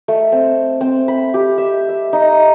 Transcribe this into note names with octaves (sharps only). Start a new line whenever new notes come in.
A3
C4
C4
B5
G4
E5
E5
D#4